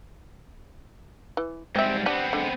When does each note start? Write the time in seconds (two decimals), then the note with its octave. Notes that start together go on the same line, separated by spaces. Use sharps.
1.37 E3
1.76 G#2 G3 C4 D#5 E5 G5
2.06 G3 B3 C4 D4 F#5
2.33 D3 G#3